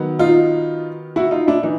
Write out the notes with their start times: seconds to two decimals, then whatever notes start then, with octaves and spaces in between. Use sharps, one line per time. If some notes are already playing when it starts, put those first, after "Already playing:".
Already playing: D#3 F#3 B3
0.19 D#4 F4
1.16 E4 F#4
1.31 D#4 F4
1.47 D4 E4
1.63 E3 D#4